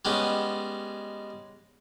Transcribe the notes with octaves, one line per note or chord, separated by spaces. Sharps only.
G3 G#3 B3 C#4